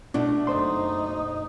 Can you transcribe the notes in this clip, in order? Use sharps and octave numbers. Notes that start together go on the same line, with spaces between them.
B2 A3 D4
F#1 D#4 C5 C6